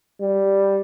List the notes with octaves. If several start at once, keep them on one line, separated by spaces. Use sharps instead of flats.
G3